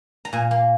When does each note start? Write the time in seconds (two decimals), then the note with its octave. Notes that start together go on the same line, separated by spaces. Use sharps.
0.25 A#5
0.33 A#2 G#5
0.51 A#3